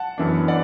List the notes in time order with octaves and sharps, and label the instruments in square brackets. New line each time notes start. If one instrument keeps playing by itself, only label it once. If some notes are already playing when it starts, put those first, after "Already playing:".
Already playing: [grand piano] F#5 A5
F#2 E3 B3 D4
D5 F#5